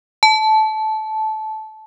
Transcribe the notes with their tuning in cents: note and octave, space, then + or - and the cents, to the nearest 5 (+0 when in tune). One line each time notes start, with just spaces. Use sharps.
A5 -15